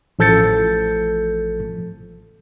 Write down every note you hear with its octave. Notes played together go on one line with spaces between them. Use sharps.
A1 F3 A4 G6 A6 C#7